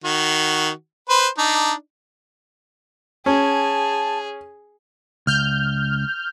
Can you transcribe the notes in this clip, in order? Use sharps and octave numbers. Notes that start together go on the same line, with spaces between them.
D#3 F#4
B4 C5
D4 D#4
C#4 G#4 A5
C#2 F6 G6